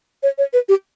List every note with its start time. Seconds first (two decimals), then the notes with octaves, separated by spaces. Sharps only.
0.23 C#5
0.38 C#5
0.53 B4
0.69 G4